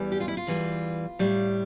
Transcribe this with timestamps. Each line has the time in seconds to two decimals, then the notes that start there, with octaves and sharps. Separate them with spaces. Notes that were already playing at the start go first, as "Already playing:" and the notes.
Already playing: E2 E3 G3
0.12 G4
0.20 F4
0.28 E4
0.37 F4
0.47 E2 E3 G3
1.19 A2 G3